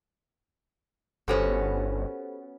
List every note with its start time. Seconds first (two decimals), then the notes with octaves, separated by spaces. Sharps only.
1.28 G1 B3 C#4 F#4 G4 A4 C5